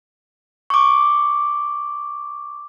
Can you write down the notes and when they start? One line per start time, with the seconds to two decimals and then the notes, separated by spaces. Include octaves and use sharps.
0.70 C#6 D6